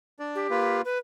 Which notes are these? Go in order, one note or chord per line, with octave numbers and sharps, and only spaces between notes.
D4 D5
G4
A#3 F4 B4
B4